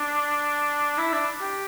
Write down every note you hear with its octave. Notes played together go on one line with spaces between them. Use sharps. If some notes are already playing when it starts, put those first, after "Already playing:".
Already playing: D4
E4
D4
G4